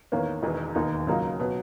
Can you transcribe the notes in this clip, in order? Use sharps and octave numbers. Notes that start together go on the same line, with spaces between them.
E2 D#3 A#3 C#4
E1 E2 D#3
E1 D#2 D#3 A#3 D#4
C#2 C#3 F#3 A#3 D#4
B2 F#3